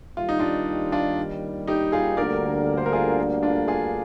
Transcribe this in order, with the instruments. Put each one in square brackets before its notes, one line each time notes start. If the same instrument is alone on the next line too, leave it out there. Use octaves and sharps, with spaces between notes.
[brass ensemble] D#2 D#3 G3 [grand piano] F4
[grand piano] D#4
D4 F4
D4 F4
D#4 G4
F4 G#4
[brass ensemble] D2 D3 G3 A#3 [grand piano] A#4 D5
[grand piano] C5
A#4
F4 G#4
D4 F4
F4 G#4